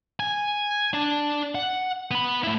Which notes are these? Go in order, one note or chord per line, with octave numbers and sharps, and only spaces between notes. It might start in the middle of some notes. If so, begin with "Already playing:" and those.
G#5
D4 A5
F#5
B3 B5
A3 E4